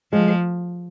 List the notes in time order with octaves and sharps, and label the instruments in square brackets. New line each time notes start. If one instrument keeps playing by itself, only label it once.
[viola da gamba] F3 [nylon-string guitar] G#3